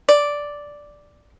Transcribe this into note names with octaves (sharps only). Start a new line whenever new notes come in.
D5